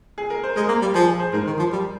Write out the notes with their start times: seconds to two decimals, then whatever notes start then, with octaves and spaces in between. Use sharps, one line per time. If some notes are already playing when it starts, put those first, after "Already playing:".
0.18 G#4
0.30 A#4
0.44 C5
0.56 G#3 A#4
0.68 A#3
0.82 G3
0.94 F3 G#4
1.08 G#4
1.20 C5
1.33 G#2 A#4
1.47 D#3
1.59 F3
1.72 G3